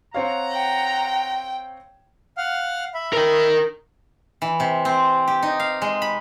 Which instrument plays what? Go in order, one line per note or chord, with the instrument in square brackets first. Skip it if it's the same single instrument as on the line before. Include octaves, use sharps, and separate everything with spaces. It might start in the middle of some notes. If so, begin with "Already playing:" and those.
[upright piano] C4 C#5 F5 [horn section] F#5 A#5
[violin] G5
[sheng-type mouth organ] F5 F#5 F6
E5 B5
[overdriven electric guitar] A#4 D#5
[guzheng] E3
C3
C4
G4
D#4
F5
G#3
B5